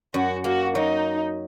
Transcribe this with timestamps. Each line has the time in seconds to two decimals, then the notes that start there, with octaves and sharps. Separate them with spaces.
0.14 F#2 F#4
0.44 A#3 F#4
0.75 F#3 D#4